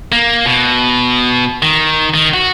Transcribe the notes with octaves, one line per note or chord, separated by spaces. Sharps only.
A#3
B2
D#3
D#3
F#4